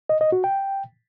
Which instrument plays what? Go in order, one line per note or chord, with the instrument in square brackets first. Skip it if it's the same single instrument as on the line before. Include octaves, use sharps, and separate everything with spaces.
[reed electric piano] D#5
D#5
F#4
G5